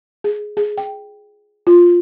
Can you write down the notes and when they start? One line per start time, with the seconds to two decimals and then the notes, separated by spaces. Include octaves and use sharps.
0.24 G#4
0.57 G#4
0.78 G5
1.67 F4